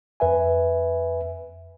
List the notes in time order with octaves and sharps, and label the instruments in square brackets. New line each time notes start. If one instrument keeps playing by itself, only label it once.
[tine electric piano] F2 B4 E5 G#5